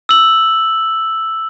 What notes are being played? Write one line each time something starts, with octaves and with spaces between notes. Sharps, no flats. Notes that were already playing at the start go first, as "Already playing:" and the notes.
E6 F#7